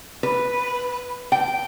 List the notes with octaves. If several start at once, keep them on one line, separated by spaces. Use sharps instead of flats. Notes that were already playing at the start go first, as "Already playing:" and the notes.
B4
G5